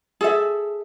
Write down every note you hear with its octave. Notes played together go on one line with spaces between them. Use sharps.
G#4 A4 E5